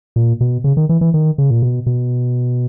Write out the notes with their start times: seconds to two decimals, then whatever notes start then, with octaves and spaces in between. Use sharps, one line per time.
0.16 A#2
0.41 B2
0.64 C#3
0.77 D#3
0.89 E3
1.01 E3
1.14 D#3
1.38 C#3
1.51 A#2
1.62 B2
1.86 B2